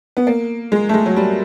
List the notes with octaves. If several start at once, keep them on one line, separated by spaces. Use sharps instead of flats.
B3
A#3
G#3
A3
G#3
F#3
G3